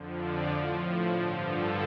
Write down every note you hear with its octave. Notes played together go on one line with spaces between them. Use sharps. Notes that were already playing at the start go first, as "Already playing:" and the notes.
Already playing: F2 D3 F3
D5
A2 F3
G2 D3 F3 D5
A4